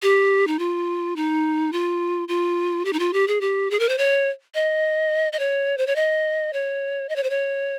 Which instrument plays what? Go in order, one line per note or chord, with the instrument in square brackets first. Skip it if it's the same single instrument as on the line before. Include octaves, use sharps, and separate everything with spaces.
[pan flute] G4
D#4
F4
D#4
F4
F4
G4
D#4
F4
G4
G#4
G4
G#4
A#4
C5
C#5
D#5
D#5
C#5
C5
C#5
D#5
C#5
D#5
C#5
C5
C#5